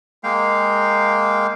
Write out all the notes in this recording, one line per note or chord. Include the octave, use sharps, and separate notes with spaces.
G#3 A#3 F5 G5